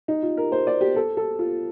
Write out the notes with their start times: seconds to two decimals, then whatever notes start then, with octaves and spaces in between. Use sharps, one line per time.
0.08 D#4
0.23 F4
0.37 A#4
0.52 C5
0.67 D5
0.81 G4
0.96 A4
1.17 A4
1.39 F4